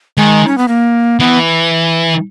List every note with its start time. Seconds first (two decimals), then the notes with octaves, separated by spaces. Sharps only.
0.17 D#3 G#3
0.48 C#4
0.58 B3
0.68 A#3
1.20 E3 B3